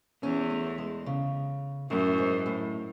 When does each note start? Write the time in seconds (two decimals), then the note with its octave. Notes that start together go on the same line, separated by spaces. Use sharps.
0.23 E2 C#4
0.50 A3
0.78 G#3
1.06 C#3
1.90 F#2 A2
2.18 G#2
2.46 A2